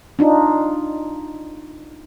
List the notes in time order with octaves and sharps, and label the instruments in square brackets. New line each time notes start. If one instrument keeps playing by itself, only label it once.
[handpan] D4 D#4 F4